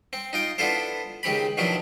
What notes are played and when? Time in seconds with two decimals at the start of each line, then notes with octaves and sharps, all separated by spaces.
0.13 C4
0.33 D#4 F4 G5
0.58 B3 D4 E4 F4 A4 C5
1.23 C#2 D#3 C4 G4 B5
1.57 B2 D#3 F3 F#3 D4 E4